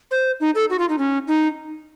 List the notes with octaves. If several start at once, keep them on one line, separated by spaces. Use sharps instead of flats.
C5
D#4
A4
F#4
F4
D#4
C#4
D#4